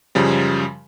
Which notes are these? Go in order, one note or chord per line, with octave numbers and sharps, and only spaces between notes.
F#2 C#3 F3 G3